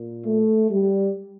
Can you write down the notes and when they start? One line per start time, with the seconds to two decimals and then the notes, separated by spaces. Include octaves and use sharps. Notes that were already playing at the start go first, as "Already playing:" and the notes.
Already playing: A#2
0.25 A3
0.70 G3